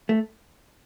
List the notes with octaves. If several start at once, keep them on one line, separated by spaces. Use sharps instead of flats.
A3